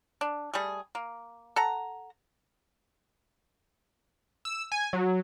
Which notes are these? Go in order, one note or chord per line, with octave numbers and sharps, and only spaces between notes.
D4
G3 A3 G#4
A#3
A4 F#5 A#5
E6
G#5
F#3